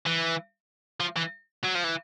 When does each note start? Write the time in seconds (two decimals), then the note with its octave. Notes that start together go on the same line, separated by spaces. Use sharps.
0.06 E3
1.00 F3
1.16 E3
1.64 F#3
1.75 F3
1.84 E3